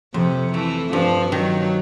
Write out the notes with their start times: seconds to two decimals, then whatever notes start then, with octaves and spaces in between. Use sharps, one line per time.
0.14 F2 C3
0.53 E3 A3
0.93 G2 F3
1.32 D#3 F#3